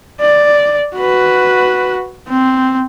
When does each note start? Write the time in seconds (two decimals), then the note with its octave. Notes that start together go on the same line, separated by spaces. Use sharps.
0.21 D5
0.97 F#4 B4
2.29 C4